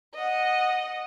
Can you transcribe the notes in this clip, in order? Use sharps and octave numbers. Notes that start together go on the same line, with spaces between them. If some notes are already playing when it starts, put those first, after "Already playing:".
D#5 F#5